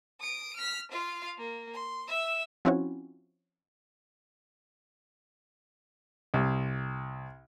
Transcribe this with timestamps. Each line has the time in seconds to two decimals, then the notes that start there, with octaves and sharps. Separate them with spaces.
0.20 D#6 D7
0.57 F6 B6
0.92 F4 F5
1.38 A#3
1.74 C6
2.08 E5 E6
2.65 F3 C4 C#4 E4 F#4 C#5
6.34 C2